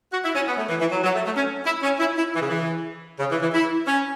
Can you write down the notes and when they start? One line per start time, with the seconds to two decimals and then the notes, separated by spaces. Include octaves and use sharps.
0.12 F#4
0.24 E4
0.35 C#4
0.47 B3
0.57 A3
0.69 E3
0.80 E3
0.91 F#3
1.03 F#3
1.15 A3
1.25 A3
1.37 C#4
1.65 E4
1.83 C#4
1.99 E4
2.17 E4
2.34 E3
2.41 C#3
2.49 E3
3.19 C#3
3.31 E3
3.42 E3
3.53 E4
3.87 C#4